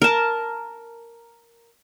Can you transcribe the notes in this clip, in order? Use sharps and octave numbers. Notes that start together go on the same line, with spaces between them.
A#4 A5